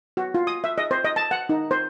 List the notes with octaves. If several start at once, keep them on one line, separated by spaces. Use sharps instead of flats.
F#4
F4
D#6
E5
D#5
C5
D#5
A5
F#5
D#4
C5